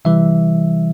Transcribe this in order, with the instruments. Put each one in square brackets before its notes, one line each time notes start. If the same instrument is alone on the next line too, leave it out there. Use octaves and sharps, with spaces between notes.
[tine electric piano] C3 E3 G3 E5